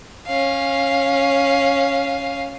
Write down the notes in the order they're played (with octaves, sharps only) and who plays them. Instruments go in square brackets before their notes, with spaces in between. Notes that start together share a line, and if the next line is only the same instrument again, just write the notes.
[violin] C#4 F5